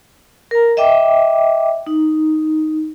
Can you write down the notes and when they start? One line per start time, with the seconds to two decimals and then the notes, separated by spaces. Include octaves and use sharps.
0.51 A#4 A#5
0.77 D#5 E5 G5 D6
1.87 D#4